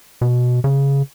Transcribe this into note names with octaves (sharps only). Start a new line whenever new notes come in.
B2
C#3